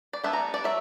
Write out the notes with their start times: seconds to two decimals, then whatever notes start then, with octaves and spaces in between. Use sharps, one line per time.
0.13 D5
0.24 G3 B3 D4 E5
0.33 A#5
0.54 D5
0.64 F#3 E5